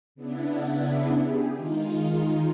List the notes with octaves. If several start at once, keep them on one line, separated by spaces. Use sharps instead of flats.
C#3 B3 D4 E4
G4 G#4
D#3 G#3 D#4 F4